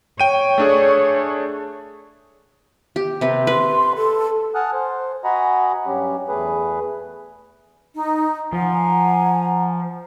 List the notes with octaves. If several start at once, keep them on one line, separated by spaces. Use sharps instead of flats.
C#5 G5 D#7
A3 D4 G#4
G4
C3 B4
B4 C6
A4
F#5 G#5 A5 D#6 F6 F#6
C5
F#4 D#5 F#5 G#5 A#5 B5
G2 F#3 C#4 G4
E2 A3 G#4 B4
D#4
F3 F#5 G#5 A#5